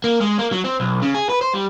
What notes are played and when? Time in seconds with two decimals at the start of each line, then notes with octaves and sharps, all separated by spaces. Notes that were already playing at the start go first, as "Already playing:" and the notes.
0.04 A#3
0.20 G#3
0.38 A#3
0.51 F#3
0.64 C4
0.80 B1
1.02 C#3
1.15 G#4
1.29 B4
1.41 C5
1.54 G3